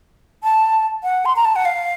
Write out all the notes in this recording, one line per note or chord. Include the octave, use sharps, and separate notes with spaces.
A5
F#5
C6
A#5
A5
F#5
F5